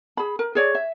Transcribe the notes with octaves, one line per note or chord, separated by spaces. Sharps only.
G#4 B5
A#4
G#4 C#5 D5
E5